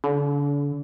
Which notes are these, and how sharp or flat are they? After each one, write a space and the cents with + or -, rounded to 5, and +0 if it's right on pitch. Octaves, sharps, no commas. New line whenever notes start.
D3 -40